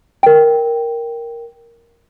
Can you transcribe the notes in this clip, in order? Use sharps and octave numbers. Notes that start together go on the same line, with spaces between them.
A#4 G5